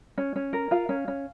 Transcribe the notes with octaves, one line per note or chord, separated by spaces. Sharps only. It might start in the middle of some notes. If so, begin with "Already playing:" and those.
C#4
C#4
A#4
F4 F5
C#4
C#4